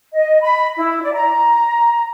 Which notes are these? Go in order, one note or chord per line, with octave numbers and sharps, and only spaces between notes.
D#5
B5
E4
D5
A#5